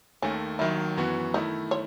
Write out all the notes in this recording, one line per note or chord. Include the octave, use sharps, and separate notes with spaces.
D#2 D#3 A3 C#4
D#2 D#3 F#3 E4
F#2 E3 B3 F#4
D#3 A3 D#4 E4
C#5